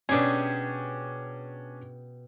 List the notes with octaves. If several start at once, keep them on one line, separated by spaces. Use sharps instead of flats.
B2 C#4 D4 G4 G#4